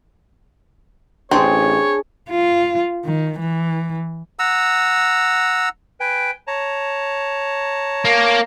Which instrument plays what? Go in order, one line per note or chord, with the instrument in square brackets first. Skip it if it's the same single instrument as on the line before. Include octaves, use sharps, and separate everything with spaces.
[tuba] A1 [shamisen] C4 [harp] D4 G#4 [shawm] C#5
[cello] F4
D#3
E3
[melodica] F#5 A#5 E6
[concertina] B4 G5 G#5
C#5 A5 A#5
[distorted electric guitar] A#3